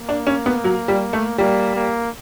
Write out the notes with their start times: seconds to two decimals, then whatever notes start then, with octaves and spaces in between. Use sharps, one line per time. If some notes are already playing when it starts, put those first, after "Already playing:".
Already playing: A#3
0.09 D4
0.27 C#4
0.46 B3
0.64 F#3
0.88 G3
1.13 A3
1.38 G3 A#3
1.76 A#3